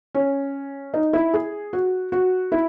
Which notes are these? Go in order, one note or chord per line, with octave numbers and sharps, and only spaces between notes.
C#4
D#4
E4
G#4
F#4
F#4
E4